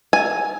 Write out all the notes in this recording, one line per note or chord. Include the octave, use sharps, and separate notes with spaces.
G#5